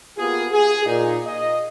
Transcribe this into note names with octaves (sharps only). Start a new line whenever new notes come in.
A#3 B3 F4 G4 G#4
G#4
A#2 D#4
D#5